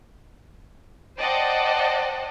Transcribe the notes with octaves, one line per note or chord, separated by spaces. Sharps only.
C5 D5 D#5 F#5 G5 A5